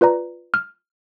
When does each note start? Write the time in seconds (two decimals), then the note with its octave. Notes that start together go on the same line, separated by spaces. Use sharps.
0.01 F4 B4 D5 A#5
0.54 F6